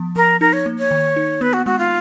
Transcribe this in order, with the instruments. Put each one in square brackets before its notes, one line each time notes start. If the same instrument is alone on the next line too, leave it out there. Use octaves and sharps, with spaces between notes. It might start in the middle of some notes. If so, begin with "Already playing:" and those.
Already playing: [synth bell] F3 B3
[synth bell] F3 [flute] A#4
[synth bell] D#4 [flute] A#4
[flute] C#5
[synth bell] A#3
[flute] C#5
[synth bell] D#3
D#4
[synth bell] B3 [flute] B4
[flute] F#4
[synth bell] G#3 [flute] F#4
[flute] F4